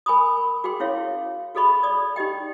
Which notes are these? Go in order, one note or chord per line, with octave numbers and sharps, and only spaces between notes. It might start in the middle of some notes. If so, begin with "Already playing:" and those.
A#4 G#5 B5 C#6 D#6
F#4 G#4 G5 C6
C#4 E4 C#5 F5
F#4 G#4 A4 D#5 B5 C#6
D5 D#6
D#4 G4 D#5 G5